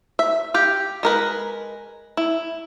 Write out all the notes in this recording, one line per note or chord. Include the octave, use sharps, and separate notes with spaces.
E5
G4 F5
G#3 A#4 B4
E4